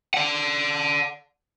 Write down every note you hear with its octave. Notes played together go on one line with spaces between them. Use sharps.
D5 F#5